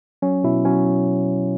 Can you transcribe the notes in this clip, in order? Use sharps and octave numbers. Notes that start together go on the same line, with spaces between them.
F#3 C#4
B2 E4
F#3 C#4